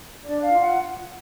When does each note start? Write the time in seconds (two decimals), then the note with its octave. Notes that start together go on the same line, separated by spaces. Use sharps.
0.24 D4 D5
0.43 F5
0.51 F4
0.61 F#5